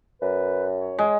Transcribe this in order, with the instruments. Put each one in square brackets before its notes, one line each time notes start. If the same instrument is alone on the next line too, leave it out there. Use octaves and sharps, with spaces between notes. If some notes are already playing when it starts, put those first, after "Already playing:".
[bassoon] F#2 [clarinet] B4
[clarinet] C#5
[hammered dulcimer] G#3